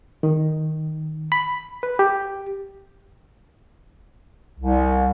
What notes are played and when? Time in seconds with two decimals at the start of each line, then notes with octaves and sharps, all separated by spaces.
0.23 D#3
1.32 B5
1.83 B4
1.99 G4
4.59 C2